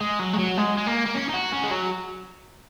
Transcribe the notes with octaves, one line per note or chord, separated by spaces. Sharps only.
G#3
F#3
G#3
F#3
G#3
G#3
A#3
A#3
C#4
D#4
F#4
C#4
G#3
F#3